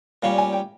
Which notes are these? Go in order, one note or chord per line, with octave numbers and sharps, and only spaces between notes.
A#2 G3 C#4 F5
G#5
G5